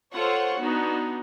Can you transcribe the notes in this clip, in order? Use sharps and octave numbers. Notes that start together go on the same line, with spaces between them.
F4 A4 C5 C#5 F#5 C#6
B3 D4 D#4 F#4